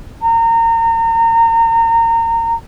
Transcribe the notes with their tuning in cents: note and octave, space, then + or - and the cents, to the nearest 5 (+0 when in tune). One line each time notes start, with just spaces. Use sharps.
A#5 -30